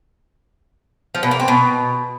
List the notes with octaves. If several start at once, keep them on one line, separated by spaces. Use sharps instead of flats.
F3
B2
A#3
C4
B2